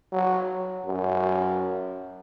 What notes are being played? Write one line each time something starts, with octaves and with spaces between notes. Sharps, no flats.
F#3
F#2